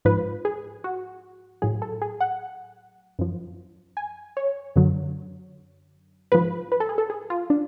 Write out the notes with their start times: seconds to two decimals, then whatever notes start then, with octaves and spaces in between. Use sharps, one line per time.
0.05 G#2 F3 B4
0.45 G#4
0.84 F#4
1.62 A2 F#3 G#4
1.82 A4
2.02 G#4
2.20 F#5
3.19 F#2 F3
3.97 G#5
4.37 C#5
4.76 F#2 D3 F#3
6.32 G#2 F3 B4
6.72 B4
6.80 A4
6.89 G#4
6.98 A4
7.10 G#4
7.30 F4
7.50 D4